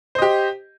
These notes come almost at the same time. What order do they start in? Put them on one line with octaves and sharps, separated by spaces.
C5 D#5 G4